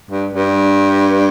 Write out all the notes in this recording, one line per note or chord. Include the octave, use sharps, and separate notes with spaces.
G2
G2